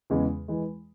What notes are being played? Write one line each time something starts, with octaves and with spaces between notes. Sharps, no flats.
E2 C#3 E3 G#3
E3 G#3